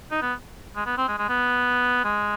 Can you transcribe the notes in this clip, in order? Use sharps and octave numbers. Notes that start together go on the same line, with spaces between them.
D#4
B3
G#3
B3
C4
G#3
G#3
B3
G#3